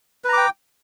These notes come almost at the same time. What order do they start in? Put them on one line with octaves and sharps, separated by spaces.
B4 A#5 D6 G5